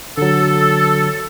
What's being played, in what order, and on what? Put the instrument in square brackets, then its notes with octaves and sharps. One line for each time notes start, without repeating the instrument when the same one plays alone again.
[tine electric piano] D3 F#3 [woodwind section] A4